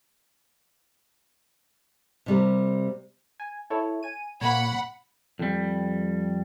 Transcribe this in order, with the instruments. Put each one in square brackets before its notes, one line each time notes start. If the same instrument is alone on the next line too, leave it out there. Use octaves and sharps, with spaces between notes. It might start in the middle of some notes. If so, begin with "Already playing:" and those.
[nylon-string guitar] C3 G3 A#3
[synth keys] G#5
E4 A4 C#5
G#5 D#7
[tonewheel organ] A#2 [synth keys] A#3 C#5 [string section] F#5 B5
[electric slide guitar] F2 G3